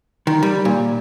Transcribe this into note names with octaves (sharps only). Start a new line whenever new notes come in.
D#3
G3
A#2